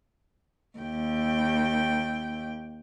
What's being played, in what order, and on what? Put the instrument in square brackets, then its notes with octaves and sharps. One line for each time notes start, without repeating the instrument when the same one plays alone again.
[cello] D#2 G5